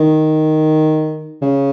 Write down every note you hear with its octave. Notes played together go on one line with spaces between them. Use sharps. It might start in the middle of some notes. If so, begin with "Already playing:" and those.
Already playing: D#3
C#3